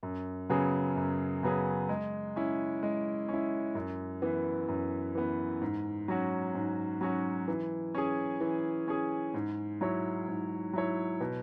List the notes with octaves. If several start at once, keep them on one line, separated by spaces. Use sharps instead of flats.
F#2
C#3 F#3 B3 G#4
F#2
C#3 F#3 B3 G#4
G#3
C#4 E4
G#3
C#4 E4
F#2
E3 B3
F#2
E3 B3
G#2
F#3 C#4 F#4
G#2
F#3 C#4 F#4
E3
C#4 G#4
E3
C#4 G#4
G#2
F#3 E4 C#5
G#2
F#3 E4 C#5
B2